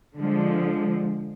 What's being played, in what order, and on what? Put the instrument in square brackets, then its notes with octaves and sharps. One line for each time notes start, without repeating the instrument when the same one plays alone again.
[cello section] D3 F3 G#3